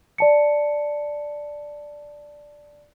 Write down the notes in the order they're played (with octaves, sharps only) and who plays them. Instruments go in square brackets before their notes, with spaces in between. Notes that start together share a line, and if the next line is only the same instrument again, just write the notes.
[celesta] D5 A5 C#7